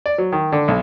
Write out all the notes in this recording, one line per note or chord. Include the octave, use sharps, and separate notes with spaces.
D5
F#3
D#3
D3
B1